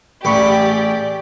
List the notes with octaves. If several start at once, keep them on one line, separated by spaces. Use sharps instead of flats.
A1 G4 G#4 D5 B5 C#6